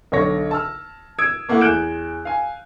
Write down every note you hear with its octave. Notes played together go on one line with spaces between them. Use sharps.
B1 D3 C#5 A#6
A5 E6 F6
D#6 E6 G#6 D7
A3 A#3 E4 F#5
E2 F#6 G6 D7 E7
F5 G#5